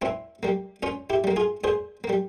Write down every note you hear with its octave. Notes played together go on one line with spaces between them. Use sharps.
A#2 C4 E4
G3 A#3
A#2 C#4 F4
E4 G4
G3 A#3
F4 G#4
A#2 G#4 C5
A#3
G3